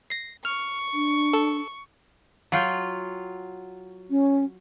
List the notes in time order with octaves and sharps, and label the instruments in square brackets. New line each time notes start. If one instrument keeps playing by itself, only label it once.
[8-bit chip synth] A#6 C7
[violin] C#6 [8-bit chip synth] F6
[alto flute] D4
[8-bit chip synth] A4
[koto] F#3 F4 G5
[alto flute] C#4